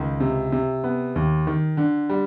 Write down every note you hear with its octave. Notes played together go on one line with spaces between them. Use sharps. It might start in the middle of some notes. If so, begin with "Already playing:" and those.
Already playing: C#2 D#3
C3
C3
B3
D#2
D#3
D3
G3